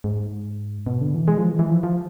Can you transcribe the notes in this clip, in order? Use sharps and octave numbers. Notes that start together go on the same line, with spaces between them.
G#2
B2
D3
E3
G#3
F3
E3
E3
F3
F3